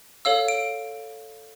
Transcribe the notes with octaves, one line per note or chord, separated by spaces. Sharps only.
A4 C#5 F5 E6
D7